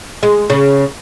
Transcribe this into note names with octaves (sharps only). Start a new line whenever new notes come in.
G#3
C#3